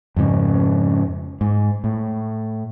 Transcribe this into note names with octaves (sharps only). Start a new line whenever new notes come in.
F2 G#2 C#3 C#4
G#2
A2